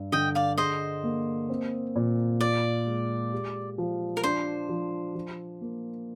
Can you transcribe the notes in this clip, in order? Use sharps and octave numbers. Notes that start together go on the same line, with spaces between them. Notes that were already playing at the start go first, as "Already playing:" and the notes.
Already playing: G2
D3 D#5 G5
D5 F5
G#4 C5 D#5
A#3
C4
A#2
F4 D5
G#3
G4
F3
A#4
D4 C5
F3
F3
A#3